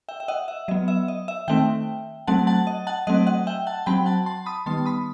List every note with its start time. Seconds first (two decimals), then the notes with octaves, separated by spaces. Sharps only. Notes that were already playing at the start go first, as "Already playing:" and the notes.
0.09 E5 G5
0.20 E5
0.28 D#5 F#5
0.48 E5
0.68 F#3 B3 D#5
0.88 E5
1.08 D#5
1.28 E5
1.48 D#3 A3 C4 E5 G5
2.27 F#3 A3 C4 F#5 A5
2.47 F#5 A5
2.67 D#5
2.87 F#5 A5
3.07 F#3 A3 C4 D#5 F#5
3.27 D#5 F#5
3.47 E5 G5
3.67 F#5 A5
3.86 F#3 C4 G5 B5
4.06 F#5 A5
4.26 A5 C6
4.46 B5 D#6
4.66 D#3 G3 B3 A5 C6
4.86 B5 D#6